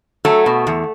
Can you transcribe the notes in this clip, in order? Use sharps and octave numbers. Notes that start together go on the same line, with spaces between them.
F#3 A3
B2
E2